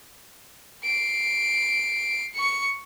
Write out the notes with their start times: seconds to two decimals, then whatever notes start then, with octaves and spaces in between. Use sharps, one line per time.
0.84 C7 D7
2.35 C#6 C#7